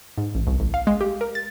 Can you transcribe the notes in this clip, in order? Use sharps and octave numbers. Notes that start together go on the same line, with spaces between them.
G#2
A1
C2
A1
F5
G#3
G4
A#4
A6